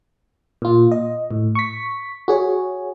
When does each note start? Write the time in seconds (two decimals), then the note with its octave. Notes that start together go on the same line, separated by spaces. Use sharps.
0.62 A#2 F4
0.91 D#5
1.31 A2
1.55 C#6 B6
2.28 F#4 G#4 C#5